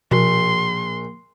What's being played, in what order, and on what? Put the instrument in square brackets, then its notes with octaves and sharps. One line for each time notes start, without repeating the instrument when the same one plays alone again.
[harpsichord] A#1 [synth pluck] B2 F#4 [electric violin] C6